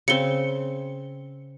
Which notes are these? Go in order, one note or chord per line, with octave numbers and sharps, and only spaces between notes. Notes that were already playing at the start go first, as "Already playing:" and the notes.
C#3 C4 C#7 G7